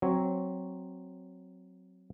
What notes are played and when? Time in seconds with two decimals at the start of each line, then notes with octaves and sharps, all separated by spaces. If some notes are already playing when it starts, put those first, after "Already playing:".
0.02 F#3 C4 C#5